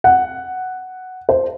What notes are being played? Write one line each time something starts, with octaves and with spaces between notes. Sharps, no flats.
F#5
C5